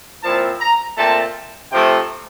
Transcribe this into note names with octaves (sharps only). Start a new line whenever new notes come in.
A#2 F3 C4 E4 A5
A#5
A#2 A3 C4 A5
C3 F3 A3 G5